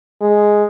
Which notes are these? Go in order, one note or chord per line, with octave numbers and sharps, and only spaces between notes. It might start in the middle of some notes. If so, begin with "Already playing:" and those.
G#3